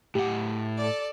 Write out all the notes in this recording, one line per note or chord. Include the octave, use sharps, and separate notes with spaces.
A2 G4 F#5
A4 D5